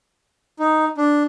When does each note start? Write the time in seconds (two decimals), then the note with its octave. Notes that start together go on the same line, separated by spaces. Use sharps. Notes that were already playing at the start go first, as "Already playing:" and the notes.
0.59 D#4
0.97 D4